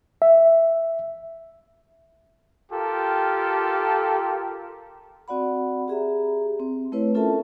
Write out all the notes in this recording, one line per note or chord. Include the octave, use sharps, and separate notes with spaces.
E5
F4 G4 A4 A#4
C4 F#4 D5 F#5 B5
G4 G#4 E5 A#5
C4
A3 C4 E4 B4 C#5
C#4 F4 A4 A#4 E5 A5